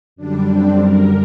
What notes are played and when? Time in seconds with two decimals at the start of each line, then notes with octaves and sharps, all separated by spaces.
0.16 F#2 D3 G3 D4
0.49 C4
0.81 F#2 D3 G3 A#4